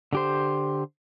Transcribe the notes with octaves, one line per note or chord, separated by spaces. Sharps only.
D3 G4 C5